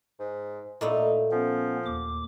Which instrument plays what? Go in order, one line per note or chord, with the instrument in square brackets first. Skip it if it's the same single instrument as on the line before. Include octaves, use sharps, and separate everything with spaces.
[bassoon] G#2
[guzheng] A#2 A3 E4 [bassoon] D#4
[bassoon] F3 [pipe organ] B3 C#4
[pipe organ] D#2 D6